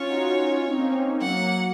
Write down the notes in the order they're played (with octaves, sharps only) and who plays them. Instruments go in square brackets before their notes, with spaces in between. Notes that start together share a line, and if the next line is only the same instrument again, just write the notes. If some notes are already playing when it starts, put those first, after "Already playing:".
Already playing: [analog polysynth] C#4 F4 [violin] C#5
[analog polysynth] D#4 F#4
C#4 F4
C4 D#4
A#3 C#4
[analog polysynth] F#3 A#3 [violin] F#5